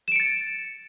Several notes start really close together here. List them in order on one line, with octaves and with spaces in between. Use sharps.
E7 D7 C#7 A6